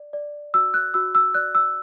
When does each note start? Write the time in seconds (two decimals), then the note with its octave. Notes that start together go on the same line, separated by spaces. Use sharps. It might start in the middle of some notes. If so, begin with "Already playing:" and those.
Already playing: D5
0.13 D5
0.54 F#4 E6
0.74 F#6
0.94 F#4 E6
1.15 E6
1.34 D5 F#6
1.55 E6